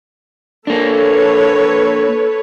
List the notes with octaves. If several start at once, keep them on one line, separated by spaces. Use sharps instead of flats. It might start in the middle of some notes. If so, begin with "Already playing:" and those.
A#3 D4 A4 B4 C#5